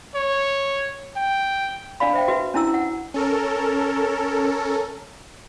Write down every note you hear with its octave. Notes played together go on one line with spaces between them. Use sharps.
C#5
G5
D4 D5 F5 B5
C5 E5 G5
F#4 B4 E5
C#4 D4 E4 A#5 E6
F#5
C#4 A4 A#4